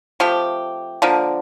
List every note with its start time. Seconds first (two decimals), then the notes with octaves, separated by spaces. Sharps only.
0.20 F3 A3 C4 G4
1.02 D3 F3 A#3